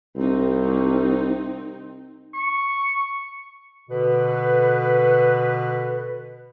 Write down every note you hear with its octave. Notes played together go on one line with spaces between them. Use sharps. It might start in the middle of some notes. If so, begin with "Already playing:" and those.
C2 C4 D#4
C#6
B2 D3 B4